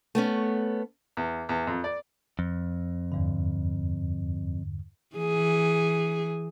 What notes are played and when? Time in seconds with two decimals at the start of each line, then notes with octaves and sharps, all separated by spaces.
0.15 A3 B3 C#4
1.17 E2
1.49 E2
1.67 F2
1.84 D5
2.39 F2
3.12 E2 G2 D3
5.16 E3 G#4